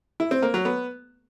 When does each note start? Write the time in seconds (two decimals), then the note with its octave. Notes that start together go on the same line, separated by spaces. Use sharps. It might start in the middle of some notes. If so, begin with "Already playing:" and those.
0.20 E4
0.31 C4
0.42 A#3
0.54 F#3
0.65 B3